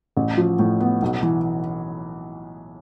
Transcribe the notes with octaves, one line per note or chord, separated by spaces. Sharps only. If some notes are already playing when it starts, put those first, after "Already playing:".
A1
F3
A2
B3
B1
E3